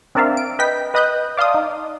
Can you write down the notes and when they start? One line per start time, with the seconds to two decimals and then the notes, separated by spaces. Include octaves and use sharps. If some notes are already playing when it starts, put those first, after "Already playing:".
0.15 C4 D4 A#4 D5 E5 F5
0.37 D7
0.59 B4 D#5 G5 B6
0.94 B4 D#5 B5 D#6 F#6 G6
1.37 D5 F5 A5 C6 D#6
1.54 D#4